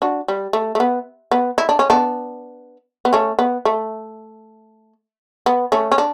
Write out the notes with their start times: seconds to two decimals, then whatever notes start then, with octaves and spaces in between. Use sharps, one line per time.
0.02 D4 F#4
0.28 G3
0.53 A3
0.75 A3
0.80 B3
1.32 B3
1.58 E4
1.69 D4
1.79 C#4
1.90 B3 D4
3.05 B3
3.13 A3 C#4
3.39 B3
3.65 A3
5.46 B3
5.72 A3 C#4
5.92 C#4
5.98 D4